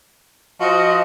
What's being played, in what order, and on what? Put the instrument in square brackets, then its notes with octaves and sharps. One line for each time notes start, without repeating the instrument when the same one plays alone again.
[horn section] F3 F#4 [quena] D#5